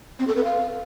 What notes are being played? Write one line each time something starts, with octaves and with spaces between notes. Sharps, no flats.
C4
A4
B4
F5